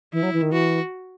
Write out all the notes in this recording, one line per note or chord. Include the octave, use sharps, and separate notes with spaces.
E3 E4
F#3
E3
D#3
E3 F#4